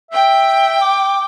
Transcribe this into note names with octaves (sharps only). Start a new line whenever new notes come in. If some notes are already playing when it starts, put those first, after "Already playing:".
E5 G5
D6